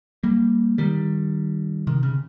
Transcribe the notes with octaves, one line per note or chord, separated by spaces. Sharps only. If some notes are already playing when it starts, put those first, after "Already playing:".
G3 A#3
D#3 G3
C3 D#3
C#3